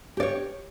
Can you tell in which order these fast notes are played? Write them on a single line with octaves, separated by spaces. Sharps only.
G4 D5 C#5